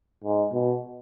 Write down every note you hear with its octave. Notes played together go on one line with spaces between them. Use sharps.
G#2
B2